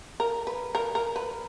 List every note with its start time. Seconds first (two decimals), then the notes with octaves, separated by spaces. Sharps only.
0.20 A#4
0.47 B4
0.75 A#4
0.95 A#4
1.16 B4